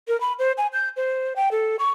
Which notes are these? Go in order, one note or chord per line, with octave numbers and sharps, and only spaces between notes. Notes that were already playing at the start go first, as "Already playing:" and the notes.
A#4
B5
C5
G#5
G6
C5
G5
A4
C#6